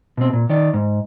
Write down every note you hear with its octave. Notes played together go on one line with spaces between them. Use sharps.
B2 C4
A#2
D#3 D5
G#2